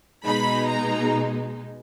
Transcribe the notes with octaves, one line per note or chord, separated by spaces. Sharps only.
B2 G#3 D#4 B5
A#5